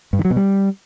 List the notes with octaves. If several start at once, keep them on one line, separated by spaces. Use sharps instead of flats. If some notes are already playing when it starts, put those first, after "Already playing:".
G2
D#3
F#3
B2
G3